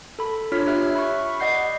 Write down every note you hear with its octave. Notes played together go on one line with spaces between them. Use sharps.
A4 B5
D4 F4 C#5 F6 B6
G4 E5 F6 F#6
B5 C#6
D5 D#5 F#5 G6 C7